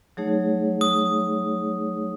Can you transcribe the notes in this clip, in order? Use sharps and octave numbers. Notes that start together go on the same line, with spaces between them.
F#3 A3 D#4 G#4 C#5
D#6